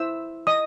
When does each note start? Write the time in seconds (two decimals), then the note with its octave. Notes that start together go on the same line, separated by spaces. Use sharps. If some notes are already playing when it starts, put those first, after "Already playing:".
Already playing: E4 C5 E5 E6
0.47 D#5 D#6